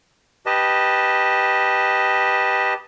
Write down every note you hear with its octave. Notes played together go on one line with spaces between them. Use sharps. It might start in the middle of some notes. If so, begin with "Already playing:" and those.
G4 B4 D#5 A5